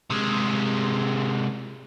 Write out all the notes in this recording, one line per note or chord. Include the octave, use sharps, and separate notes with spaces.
C3 G#3